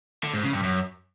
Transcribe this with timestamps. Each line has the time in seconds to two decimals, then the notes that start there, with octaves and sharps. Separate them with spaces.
0.24 D3
0.33 G#2
0.43 C#3
0.53 G2
0.63 F#2